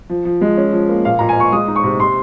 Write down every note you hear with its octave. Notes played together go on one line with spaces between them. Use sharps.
F3
F3
G#3
C#4
F3
A#3
A#2 F5
A#2 A#5
G#5
A#2 C#6
G#3 D#6
D#4
C#6
C3
C3 C6